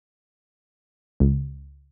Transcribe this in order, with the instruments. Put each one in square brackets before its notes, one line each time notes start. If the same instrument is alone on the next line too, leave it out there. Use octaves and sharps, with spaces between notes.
[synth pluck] C#2